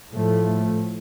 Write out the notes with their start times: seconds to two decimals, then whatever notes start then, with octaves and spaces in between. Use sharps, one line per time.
0.12 A2 F3 A3